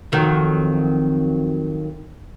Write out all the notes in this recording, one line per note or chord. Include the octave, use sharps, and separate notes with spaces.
F2 D#3 F#3